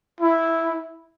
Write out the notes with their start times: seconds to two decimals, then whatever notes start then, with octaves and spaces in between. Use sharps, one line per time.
0.21 E4